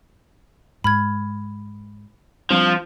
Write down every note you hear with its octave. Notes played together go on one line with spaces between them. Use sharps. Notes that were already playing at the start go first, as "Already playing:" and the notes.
G#2 B5 F6 G#6
F3 G3 C4 D4